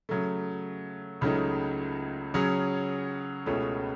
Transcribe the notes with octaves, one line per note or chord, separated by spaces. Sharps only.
C#3 F#3 A3
C#2 C#3 F#3 A3 D#4
C#3 F#3 C#4 G#4
C#2 B2 A3 C#4 G#4